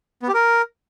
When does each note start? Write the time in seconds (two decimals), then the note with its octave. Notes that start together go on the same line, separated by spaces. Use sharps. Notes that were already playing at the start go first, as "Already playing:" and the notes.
0.22 B3
0.28 G4
0.34 A#4